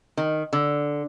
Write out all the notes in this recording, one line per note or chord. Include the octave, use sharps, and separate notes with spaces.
D#3
D3